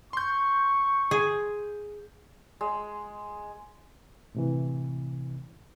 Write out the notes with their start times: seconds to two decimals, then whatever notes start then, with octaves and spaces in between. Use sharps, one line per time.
0.13 C6 C#6 G6
1.11 G#4
2.61 G#3
4.35 A2 C3 E3